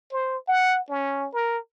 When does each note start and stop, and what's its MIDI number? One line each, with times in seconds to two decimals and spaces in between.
0.12 0.37 72
0.48 0.81 78
0.89 1.28 61
1.34 1.58 70